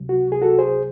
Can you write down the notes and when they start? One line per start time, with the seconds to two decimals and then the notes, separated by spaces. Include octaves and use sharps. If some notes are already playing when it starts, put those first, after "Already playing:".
Already playing: C#2 C3 F#3
0.09 F#4
0.32 G#4
0.42 F#4 A4
0.59 G#4 C5